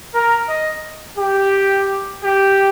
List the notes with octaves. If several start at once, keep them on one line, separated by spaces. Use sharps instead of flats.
A#4
D#5
G4
G4